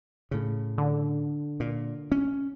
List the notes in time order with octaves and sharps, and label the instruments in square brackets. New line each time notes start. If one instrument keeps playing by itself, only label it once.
[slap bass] A2 C#3
[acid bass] D3
[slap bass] A#2
C#4